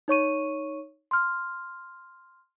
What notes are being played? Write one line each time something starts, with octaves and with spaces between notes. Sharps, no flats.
D#4 C#5 C#6 D#7
C6 F6